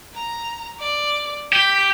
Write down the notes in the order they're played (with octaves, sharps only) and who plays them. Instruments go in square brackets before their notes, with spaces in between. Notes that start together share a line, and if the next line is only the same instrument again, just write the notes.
[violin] A#5
D5
[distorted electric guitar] G4 [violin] G6 B6